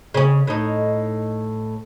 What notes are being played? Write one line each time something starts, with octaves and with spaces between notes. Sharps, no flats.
C#3 C#4
A2 D#4